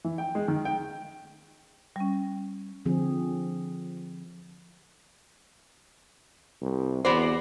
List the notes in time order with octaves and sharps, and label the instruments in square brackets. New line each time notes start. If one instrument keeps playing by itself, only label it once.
[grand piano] E3
G5
G#3
D#3
G5
[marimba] G3 C#4
[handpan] D3 F3 C4 G#4
[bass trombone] C2
[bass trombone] E2 [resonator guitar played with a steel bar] B3 F#4 D5 [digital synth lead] C5